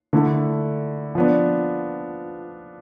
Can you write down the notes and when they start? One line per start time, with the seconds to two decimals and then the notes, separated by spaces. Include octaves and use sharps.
0.13 D3 A3 E4
1.15 F3 B3 D4